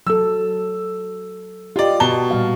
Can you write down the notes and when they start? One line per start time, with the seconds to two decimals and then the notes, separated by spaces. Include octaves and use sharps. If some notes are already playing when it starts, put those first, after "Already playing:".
0.07 F#3 A4 E6
1.76 F4 G4 D5 D#5
2.00 B2 A5 G7
2.31 A#2 G3 F5